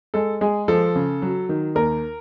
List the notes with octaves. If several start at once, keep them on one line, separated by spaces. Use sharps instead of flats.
G#3 A4
G#3 G#4
F3 A4
C#3
F#3
D#3
D#2 A#4